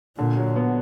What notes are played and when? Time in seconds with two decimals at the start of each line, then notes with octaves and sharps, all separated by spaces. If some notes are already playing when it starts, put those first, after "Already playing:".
0.18 A#2 D3
0.37 F#3
0.56 B3